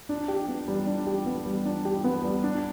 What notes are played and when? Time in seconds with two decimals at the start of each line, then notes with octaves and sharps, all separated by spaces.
0.09 D4
0.28 G4
0.48 B3
0.68 G3
0.87 D4
1.07 G4
1.26 B3
1.45 G3
1.66 D4
1.85 G4
2.04 B3
2.24 G3
2.43 D4